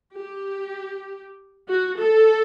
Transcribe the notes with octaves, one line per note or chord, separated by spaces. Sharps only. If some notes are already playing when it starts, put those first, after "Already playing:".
G4
F#4
A4